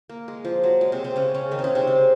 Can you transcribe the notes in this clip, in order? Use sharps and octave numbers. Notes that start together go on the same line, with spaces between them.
A#3
G#3
F3
F#3
G#3
C3 C4
C3 C4
C#3 C#4
C#3 C#4
D#3 D#4
C4
C#3 C#4
C3 C4
G#3